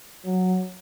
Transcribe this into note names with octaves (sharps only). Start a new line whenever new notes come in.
F#3